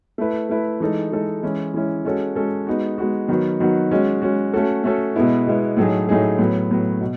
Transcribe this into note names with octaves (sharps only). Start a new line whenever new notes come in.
A3 E4 B4
A3 E4 B4
E3 G#3 D#4 A4
E3 G#3 D#4 A4
E3 G#3 C#4 E4
E3 G#3 C#4 E4
G#3 C#4 F#4 A4
G#3 C#4 F#4 A4
G#3 B3 D#4 F#4
G#3 B3 D#4 F#4
D#3 F#3 B3 F#4
D#3 F#3 B3 F#4
G#3 C#4 F#4
G#3 C#4 F#4
A3 C#4 F#4 A4
A3 C#4 F#4 A4
B2 G#3 B3 E4
B2 G#3 B3 E4
A2 F#3 A3 D#4 G#4
A2 F#3 A3 D#4 G#4
A2 F#3 B3
A2 F#3 B3
B2